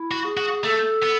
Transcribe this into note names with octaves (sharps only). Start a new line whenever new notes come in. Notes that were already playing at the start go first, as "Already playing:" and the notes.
Already playing: E4
F#4
G#4
F#4
A3 A4
B3